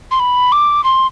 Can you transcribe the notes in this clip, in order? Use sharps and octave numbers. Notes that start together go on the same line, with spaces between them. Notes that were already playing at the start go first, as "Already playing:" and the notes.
C6
B5
D6
C6